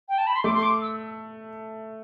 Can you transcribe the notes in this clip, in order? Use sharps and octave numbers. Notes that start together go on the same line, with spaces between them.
G5
A5
B5
C6
A3 D6
C6
D6
E6